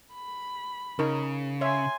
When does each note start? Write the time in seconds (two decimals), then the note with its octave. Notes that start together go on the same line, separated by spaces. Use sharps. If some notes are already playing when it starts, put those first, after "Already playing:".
0.14 B5
0.99 C#3 D#4 A#4
1.61 C#5 E5 G#5 C6